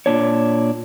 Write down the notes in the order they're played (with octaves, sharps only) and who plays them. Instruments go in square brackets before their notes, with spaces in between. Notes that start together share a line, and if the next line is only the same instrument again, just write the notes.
[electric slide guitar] A#2 D4 C#5